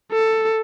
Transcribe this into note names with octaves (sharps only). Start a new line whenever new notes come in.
A4